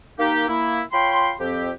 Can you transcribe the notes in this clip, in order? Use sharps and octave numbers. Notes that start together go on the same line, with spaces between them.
A#3 D#4 G4
A#3 E4
F4 C#5 G5 B5 C6
F2 C4 G4